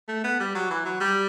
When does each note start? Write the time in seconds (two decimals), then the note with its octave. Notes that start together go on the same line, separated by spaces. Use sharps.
0.08 A3
0.24 B3
0.40 G3
0.55 F#3
0.70 E3
0.85 F#3
1.00 G3